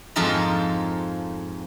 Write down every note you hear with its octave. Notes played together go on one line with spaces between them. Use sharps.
F2 G#2 F3 A4 A#4 A#5